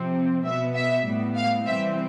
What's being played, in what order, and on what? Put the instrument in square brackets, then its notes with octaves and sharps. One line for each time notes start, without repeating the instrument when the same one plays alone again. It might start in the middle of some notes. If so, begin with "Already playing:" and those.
Already playing: [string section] C3 F3 C4
B2 B3 E5
E5
A2 G3 B3
F5
C3 E3 G3 C4 E5